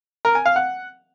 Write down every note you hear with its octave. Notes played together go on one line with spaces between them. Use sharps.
A#4
G#5
F5
F#5